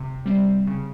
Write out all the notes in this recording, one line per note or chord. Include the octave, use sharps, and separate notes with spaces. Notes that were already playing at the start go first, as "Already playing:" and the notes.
Already playing: C3
G3 C4
C#3